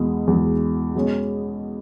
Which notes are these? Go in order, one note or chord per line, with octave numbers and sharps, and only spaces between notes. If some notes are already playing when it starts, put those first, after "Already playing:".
Already playing: E2 B2 G#3
E2 B2 G#3
B2 G#3 C#4